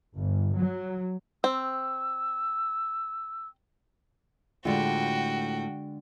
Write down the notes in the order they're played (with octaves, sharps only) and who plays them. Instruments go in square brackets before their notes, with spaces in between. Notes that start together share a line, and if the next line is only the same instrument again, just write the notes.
[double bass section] G1
F#3
[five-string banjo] C4 [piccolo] E6
[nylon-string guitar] A2 F4 [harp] D3 G#3 D4 [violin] F#4 G5